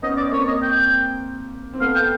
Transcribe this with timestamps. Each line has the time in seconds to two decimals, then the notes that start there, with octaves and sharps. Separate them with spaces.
0.03 B3 C#4 D#5
0.17 D5
0.32 A#3 C4 C#5
0.48 D#5
0.62 G5
1.74 C4
1.81 A3 B3 F5
1.95 G5